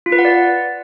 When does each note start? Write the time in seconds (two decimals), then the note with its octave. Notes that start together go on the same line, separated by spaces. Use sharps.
0.06 F4
0.12 B4
0.19 F#5
0.25 D5